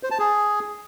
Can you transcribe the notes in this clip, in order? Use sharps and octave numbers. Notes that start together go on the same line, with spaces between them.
C5
A5
G#4